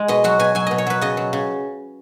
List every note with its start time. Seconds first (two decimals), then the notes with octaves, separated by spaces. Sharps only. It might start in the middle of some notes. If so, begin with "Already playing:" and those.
Already playing: G#3
0.08 B2 D#5
0.24 F#3 F#4
0.39 B2 G#5
0.55 F#3 G#5
0.67 B2 D#5
0.78 C#5
0.87 F#3 B4
1.01 C#3 D#5
1.17 F#3
1.33 C#3